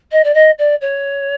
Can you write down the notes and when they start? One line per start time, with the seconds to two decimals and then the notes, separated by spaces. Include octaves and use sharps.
0.12 D#5
0.24 D5
0.34 D#5
0.59 D5
0.81 C#5